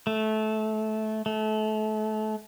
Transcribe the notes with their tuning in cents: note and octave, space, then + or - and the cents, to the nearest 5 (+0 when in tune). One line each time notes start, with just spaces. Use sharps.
A3 -20
A3 -30